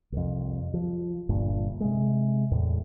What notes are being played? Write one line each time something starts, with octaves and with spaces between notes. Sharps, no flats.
C2 F2
F3
G1 G2 A#2 D3
C3 G#3
E2 A2